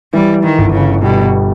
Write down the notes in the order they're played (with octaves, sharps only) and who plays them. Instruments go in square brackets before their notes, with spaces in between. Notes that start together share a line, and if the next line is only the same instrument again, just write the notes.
[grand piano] E3 [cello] G3
[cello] D#3
[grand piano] G1
[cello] C#3
[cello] B2 [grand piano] G3